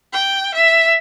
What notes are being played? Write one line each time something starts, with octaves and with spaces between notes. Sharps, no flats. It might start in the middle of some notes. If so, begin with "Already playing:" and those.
G5
E5